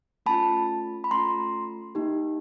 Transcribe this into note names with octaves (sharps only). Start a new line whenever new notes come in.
A3 C#4 F4 A5 B5
B5
A3 C#4 F4 A#5 C6
A#3 D#4 G4